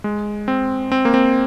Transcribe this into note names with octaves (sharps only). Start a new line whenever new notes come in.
G#3
C4
C4
A#3
C4